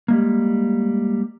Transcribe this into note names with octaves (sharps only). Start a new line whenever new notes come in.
G3 G#3 A#3